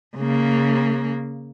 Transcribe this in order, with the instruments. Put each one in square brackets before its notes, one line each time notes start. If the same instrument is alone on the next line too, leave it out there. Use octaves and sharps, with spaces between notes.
[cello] C#3 A#3